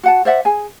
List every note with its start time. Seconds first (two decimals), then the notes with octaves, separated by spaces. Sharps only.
0.03 F#4 F#5 A5
0.25 C5 D5 E5 F#5
0.45 G#4 G#5